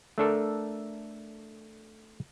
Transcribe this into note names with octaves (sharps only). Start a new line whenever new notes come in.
A3 D4 A4 A#4